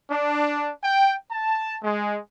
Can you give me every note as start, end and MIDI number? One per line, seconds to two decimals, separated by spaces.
0.11 0.71 62
0.84 1.13 79
1.31 1.78 81
1.83 2.18 56